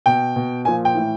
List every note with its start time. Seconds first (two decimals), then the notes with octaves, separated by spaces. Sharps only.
0.06 B2 G5
0.36 B2
0.65 A#2 F3 G#5
0.85 G5
0.95 A2 E3